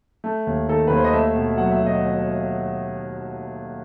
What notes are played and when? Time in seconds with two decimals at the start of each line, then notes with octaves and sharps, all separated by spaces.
0.24 A3
0.47 D#2
0.68 D#3 A4
0.87 D#2 B4
0.97 C5
1.04 D#5
1.13 A3 E5
1.34 B2
1.57 F#3 F#5
1.71 E5
1.80 B2
1.86 D#5